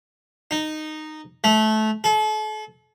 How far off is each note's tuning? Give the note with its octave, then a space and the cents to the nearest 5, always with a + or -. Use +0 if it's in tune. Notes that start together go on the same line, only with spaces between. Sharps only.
D#4 -10
A3 -20
A4 -40